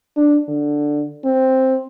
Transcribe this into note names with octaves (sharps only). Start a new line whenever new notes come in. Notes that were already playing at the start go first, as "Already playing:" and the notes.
D4
D3
C4